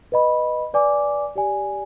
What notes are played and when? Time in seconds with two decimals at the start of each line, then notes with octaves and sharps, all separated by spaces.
0.12 B4 D#5 B5
0.74 B4 D5 G#5 D6
1.35 G4 D5 G#5